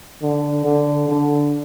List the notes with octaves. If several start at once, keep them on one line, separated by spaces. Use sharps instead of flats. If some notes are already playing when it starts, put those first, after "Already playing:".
D3
D3
D3